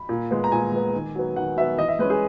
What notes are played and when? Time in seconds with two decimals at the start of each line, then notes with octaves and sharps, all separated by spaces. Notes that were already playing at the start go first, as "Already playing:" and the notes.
Already playing: B5
0.09 A#2
0.31 G#3 B3
0.44 A#5
0.52 A#2 G#5
0.72 G#3 B3
0.93 D#3
1.15 F#3 B3
1.36 D#3 F#5
1.57 F#3 B3 E5
1.78 E3 D#5
1.88 E5
1.99 G#3 C#4 B4
2.10 G#4